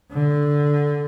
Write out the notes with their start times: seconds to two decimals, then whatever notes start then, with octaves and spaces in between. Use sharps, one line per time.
0.12 D3